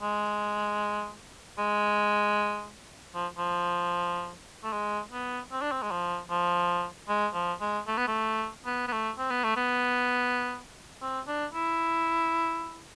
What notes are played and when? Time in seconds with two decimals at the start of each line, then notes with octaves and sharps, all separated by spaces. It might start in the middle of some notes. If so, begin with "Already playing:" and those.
0.01 G#3
1.58 G#3
3.15 F3
3.38 F3
4.64 A3
4.73 G#3
5.12 B3
5.52 C4
5.62 D4
5.72 C4
5.82 G#3
5.91 F3
6.30 F3
7.09 G#3
7.34 F3
7.61 G#3
7.87 A3
7.97 B3
8.07 A3
8.66 B3
8.88 B3
8.92 A3
9.18 C4
9.31 B3
9.44 A3
9.56 B3
11.02 C4
11.28 D4
11.54 E4